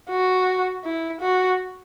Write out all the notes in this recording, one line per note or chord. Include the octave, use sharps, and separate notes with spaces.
F#4
E4
F#4